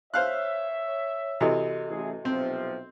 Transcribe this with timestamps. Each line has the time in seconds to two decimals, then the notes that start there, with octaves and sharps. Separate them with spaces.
0.14 C5 C#5 E5 F5 F#6
1.41 C3 E3 F#4 A4 D#5
1.87 A1 E4 G#4
2.25 B1 C3 F3 C4